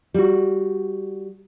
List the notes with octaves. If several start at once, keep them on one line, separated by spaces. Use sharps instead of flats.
G3 F#4